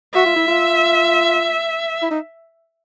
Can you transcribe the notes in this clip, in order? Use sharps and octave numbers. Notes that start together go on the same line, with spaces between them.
F#4 E5
F4
E4
F4
E4
D#4